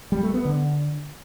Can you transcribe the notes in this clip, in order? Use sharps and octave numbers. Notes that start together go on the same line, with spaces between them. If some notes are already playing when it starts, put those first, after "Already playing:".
G3
A3
B3
D3